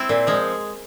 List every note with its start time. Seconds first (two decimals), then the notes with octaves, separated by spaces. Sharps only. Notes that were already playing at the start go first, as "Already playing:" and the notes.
Already playing: C4 E4
0.09 A#2
0.27 F3 G#3